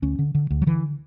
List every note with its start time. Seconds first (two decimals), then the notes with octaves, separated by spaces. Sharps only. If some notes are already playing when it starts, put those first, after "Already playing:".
0.02 D2 C#4
0.19 D3
0.35 D3
0.51 D2
0.62 F#3
0.67 D3 E3